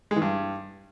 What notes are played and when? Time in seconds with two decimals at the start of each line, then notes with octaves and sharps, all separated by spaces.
0.11 G#3
0.16 E3
0.22 G2